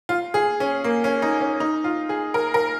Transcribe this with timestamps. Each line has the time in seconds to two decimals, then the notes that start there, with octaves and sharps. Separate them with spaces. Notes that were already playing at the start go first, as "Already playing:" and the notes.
0.09 F4
0.34 G#4
0.60 C#4
0.84 A#3
1.04 C#4
1.22 D#4
1.40 C#4
1.60 D#4
1.84 F4
2.09 G#4
2.34 A#4
2.54 A#4